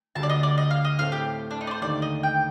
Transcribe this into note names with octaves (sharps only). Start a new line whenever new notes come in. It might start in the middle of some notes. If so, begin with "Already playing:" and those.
D2 D3 G3 A5
D5
D#5
D5
D#5
F5
D#5
A2 A3 C4 F5
G4
D4
D#4
D5
C5
D#2 D3 A3 D#4 D5
D#5
G5